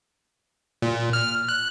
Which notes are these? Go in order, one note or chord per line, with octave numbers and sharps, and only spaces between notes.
A#2
F6
F#6